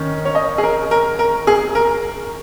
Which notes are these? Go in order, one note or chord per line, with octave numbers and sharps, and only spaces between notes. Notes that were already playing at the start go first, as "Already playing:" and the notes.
Already playing: D#3 C#4
C#5
D#5
G#4
A#4
A#4
A#4
G#4
A#4